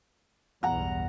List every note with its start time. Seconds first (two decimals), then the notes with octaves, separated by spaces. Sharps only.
0.63 B1 E2 G2 F#5 A#5